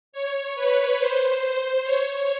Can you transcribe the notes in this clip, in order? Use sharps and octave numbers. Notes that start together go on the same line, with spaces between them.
C#5
B4
C5
C#5